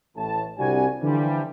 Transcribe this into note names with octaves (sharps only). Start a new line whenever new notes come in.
A1 A2 A5
C2 C3 G3 D4 F#4 G#5
D3 E3 F3 G3